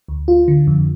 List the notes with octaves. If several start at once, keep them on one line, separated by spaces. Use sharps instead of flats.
D2
F4
D3
F2